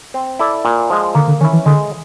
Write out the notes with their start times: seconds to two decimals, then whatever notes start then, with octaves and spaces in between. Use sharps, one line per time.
0.14 C4
0.39 E4 A4 D5
0.65 A#2
0.90 F3 G#3
1.15 D3 A#3
1.28 D3
1.41 D#3 C#4 E4
1.53 E3
1.66 D3 G#3